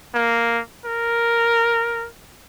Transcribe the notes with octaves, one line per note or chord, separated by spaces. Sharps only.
A#3
A#4